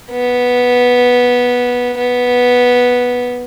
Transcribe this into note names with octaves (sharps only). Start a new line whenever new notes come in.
B3
B3